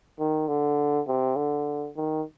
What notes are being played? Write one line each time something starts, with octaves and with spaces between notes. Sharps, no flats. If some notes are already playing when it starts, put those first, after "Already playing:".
D#3
D3
C3
D3
D#3